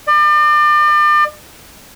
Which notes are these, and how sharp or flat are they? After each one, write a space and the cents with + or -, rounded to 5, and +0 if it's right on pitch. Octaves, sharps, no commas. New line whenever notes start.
D5 +40